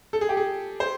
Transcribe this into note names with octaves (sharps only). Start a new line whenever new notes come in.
A4
G#4
G4
G#4
C5